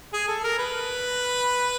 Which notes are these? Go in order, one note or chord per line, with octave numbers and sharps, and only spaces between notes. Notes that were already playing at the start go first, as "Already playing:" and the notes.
G#4
A4
A#4
B4